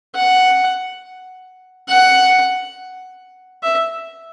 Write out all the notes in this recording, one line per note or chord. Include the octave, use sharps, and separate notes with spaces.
F#5
F#5
E5